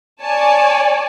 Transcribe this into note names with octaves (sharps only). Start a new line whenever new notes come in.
C#5 D5 G#5 A5